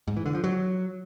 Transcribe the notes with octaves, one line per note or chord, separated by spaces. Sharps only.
G#2
E3
D3
F3
F#3